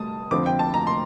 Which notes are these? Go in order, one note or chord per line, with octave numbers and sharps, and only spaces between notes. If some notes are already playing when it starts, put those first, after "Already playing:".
Already playing: G3 A5 D#6
F2 D3 F3 C4 D6
G5
A5
A#5
C6